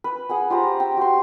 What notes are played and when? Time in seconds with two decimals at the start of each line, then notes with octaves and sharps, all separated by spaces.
0.04 B4
0.29 G#4 F#5 G#5
0.50 F4 G4 C5 A#5
0.63 A#5
0.80 G5 E6
0.97 F#4 G4 C6